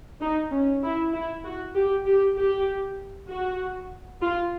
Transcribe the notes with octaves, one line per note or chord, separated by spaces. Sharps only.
D#4
C#4
E4
E4
F#4
G4
G4
G4
F#4
F4